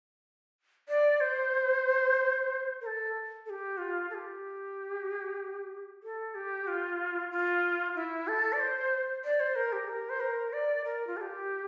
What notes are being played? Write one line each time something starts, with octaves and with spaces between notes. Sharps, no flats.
D5
C5
A#4
A4
A4
G4
F4
A4
G4
A4
G4
F4
F4
E4
A4
D5
C5
D5
C5
A#4
G4
A#4
C5
A#4
D5
A#4
F4
A4
G4